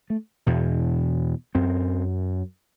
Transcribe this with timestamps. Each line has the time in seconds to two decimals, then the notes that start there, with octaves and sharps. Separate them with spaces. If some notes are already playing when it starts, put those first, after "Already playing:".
0.10 A3
0.46 E2 B2
1.55 F#2 C4